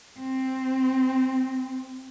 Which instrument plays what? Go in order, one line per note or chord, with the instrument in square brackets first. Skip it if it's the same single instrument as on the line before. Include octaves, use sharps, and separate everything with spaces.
[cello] C4